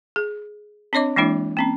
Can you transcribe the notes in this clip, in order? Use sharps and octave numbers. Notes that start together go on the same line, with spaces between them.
G#4
C4 D4 C#5 D#5 D6
E3 G#3 A#3 D4 E4
A#3 C4 C#4